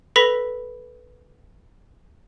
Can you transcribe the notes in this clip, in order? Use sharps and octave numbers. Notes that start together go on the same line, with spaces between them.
A4 B4 B5 A#6 B6 F7